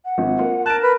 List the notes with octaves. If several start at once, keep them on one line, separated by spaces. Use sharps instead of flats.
F#5
G#1 F3
A#3 F4
A#4 A5 F#6 D7
B4